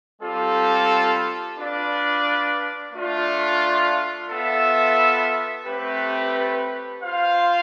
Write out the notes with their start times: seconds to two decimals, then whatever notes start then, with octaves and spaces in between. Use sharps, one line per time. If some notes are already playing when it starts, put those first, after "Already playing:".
0.21 G3 C4 F4 A4
1.57 D4 F4 B4 D5
2.93 A3 D4 F4
4.29 B3 F4 A4 E5
5.64 A3 C4 G4 B4
7.01 F4 C5 F5